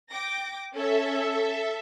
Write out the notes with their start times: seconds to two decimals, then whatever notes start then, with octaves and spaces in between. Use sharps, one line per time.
0.10 G5 D6 A#6
0.74 C#4 A4 C#5 E5